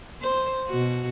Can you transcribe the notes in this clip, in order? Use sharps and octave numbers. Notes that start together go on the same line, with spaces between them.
C5
B2 F#4